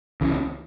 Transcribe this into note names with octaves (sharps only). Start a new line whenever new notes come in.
C#2 C#3 E3